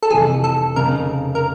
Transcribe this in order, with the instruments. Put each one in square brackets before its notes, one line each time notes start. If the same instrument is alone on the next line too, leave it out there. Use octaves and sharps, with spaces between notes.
[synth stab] A4
[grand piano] F1 F2 C3 E3 [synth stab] G#4
[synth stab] A4
[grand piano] F1 F2 C#3 [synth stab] A#4
[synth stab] A#4